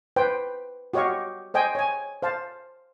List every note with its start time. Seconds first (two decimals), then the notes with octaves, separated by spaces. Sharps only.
0.16 B4 C5 G5
0.94 F#4 G4 C#5 D#5 F5 C#6
1.54 C5 D#5 G5 G#5
1.75 C#5 G#5
2.22 C5 F5 A5